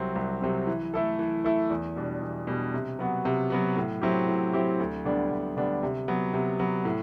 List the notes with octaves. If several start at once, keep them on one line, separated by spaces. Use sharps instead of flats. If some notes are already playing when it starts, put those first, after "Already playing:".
Already playing: C2 C3 F#3 C4
C2
C3 F#3 C4
E3
A3 E4 A4
E3
A3 E4 A4
E2
B2 G3 D4
E2
B2 G3 D4
C3
F#3 B3 F#4
C3
F#3 B3 F#4
A2
F#3 C4 E4 G4
A2
F#3 C4 E4 G4
D2
D3 G3 B3 D4
D2
D3 G3 B3 D4
C3
F#3 B3
C3
F#3 B3
A2